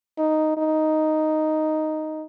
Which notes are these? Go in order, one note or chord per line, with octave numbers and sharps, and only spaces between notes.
D#4
D#4